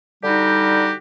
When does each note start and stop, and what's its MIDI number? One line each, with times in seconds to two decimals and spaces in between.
0.24 0.93 50
0.24 0.93 55
0.24 0.93 63
0.24 0.93 66
0.24 0.93 67